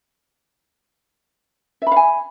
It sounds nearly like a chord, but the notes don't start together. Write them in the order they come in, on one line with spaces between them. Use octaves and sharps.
E5 B5 F5 G#5